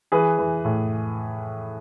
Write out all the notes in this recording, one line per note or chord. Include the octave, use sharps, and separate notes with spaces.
E3 G#4 B4
E3
A2